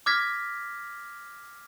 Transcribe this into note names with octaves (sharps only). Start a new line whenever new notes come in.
D6 F6 G#6 A#6 B6